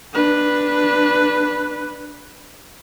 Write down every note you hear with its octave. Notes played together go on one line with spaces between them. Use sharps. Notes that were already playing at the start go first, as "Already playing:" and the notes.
D4 B4